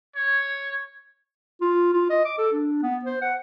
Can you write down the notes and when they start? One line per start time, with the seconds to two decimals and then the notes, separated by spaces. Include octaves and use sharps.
0.16 C#5
1.61 F4
1.93 F4
2.10 D#5
2.25 D6
2.38 A4
2.52 D4
2.83 B3
3.04 C5
3.21 F#5